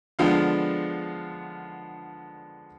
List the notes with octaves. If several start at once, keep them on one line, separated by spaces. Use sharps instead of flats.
D3 F3 G#3 B3 D4 F5 G5